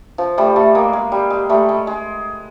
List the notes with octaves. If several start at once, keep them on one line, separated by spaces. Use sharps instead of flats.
F3
G3 A3
G3 A3
G#3 A#3
G#3
G3
G#3
G3 A3
G#3
G#3